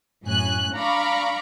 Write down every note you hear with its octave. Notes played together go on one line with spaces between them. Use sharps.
F#2 A2 C#4 G#5 F#6
D4 F5 A#5 B5 C#6 D6